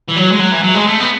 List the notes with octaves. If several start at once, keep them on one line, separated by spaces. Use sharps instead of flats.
E3
F#3
G#3
F#3
E3
F#3
G#3
A3
B3